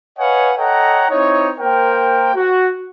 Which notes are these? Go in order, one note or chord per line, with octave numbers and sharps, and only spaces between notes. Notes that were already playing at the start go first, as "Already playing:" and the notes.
B4 C#5 D#5 F5 F#5 G#5
A4 C#5 D#5 F#5 G5 A#5
C4 D#4 E4 C#5
A#3 A#4 C5 G5
F#4